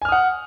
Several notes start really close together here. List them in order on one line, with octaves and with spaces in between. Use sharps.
G#5 F6 D#6 F#5